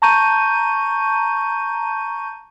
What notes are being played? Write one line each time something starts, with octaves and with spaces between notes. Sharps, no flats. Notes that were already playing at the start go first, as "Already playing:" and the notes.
A5 A#5 C#6 G6 D#7